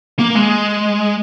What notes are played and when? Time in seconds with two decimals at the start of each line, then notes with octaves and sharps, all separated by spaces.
0.19 A#3
0.35 G#3